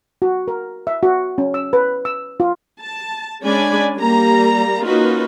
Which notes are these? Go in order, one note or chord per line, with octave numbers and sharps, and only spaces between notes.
F#4
A#4
E5
F#4
C#4
E6
B4
E6
F4
A5
G#3 C#4 D4 D5 G#5 B5
G3 A#3 A#5
A#3 C#4 D#4 F4 F#4 B4